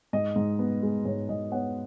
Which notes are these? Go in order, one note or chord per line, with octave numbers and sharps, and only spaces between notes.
G#2 D#5
G#2
B3
G#3
G#2 C#5
G#2 D#5
B3 C#5 F#5